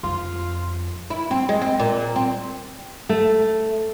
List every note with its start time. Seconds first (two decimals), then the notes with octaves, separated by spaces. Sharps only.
0.03 F2 F4
1.10 E4
1.31 C4
1.49 G#3
1.62 C4
1.80 A#2
2.16 C4
3.09 A3